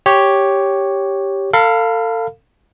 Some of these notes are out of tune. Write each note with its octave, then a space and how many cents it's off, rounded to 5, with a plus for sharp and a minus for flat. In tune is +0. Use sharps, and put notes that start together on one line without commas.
G4 +0 C#5 +0
A4 +35 F5 +0 B5 -5